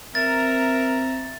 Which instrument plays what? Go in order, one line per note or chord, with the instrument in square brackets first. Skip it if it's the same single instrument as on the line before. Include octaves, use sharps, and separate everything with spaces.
[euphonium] C4 [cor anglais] A#4 [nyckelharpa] E5 A#5 [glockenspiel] A6